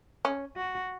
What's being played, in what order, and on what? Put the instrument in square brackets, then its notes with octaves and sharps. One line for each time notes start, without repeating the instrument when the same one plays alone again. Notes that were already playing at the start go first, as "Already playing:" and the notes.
[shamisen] C#4
[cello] F#4